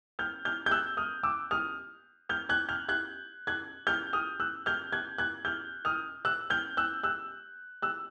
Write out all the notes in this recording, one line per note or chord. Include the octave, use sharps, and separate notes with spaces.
F6 G6
F6 G6
G6
E6 F#6
D#6 F6
D6 E6
D#6 F6
F6 G6
F#6 G#6
F6 G6
F#6 G#6
F#6 G#6
F6 G6
D#6 F6
E6 F#6
F6 G6
F#6 G#6
F#6 G#6
F6 G6
D#6 F6
E6 F#6
F6 G6
E6 F#6
E6 F#6
E6 F#6